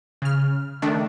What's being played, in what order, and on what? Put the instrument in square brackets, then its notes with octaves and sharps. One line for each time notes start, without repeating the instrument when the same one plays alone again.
[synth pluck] C#3 F6
D#3 A3 D4